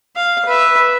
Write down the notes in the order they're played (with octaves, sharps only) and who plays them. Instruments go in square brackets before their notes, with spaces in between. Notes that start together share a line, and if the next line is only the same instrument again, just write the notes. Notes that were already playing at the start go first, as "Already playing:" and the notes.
[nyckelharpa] F5
B4 E5